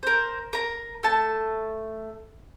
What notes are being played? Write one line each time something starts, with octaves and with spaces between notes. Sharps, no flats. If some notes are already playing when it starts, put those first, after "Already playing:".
A#4 C5
A#4 A#5
A3 A5